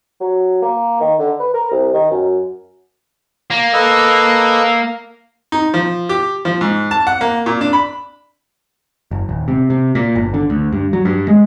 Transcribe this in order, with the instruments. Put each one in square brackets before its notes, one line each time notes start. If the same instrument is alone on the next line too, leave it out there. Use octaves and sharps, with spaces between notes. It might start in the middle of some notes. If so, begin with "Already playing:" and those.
[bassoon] F#3
A#3
D#3
D3
B4
A#4
C2
D#3
F#2
[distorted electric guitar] A#3
[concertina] A4 B4 D#5
[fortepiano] D#4
F3
G4
F3
G#2
A5
F#5
A#3
A#2
D4
B5
[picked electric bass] F#1
D#1
C3
C3
A#2
G1
D3
D2
G2
F#3
G2
G#3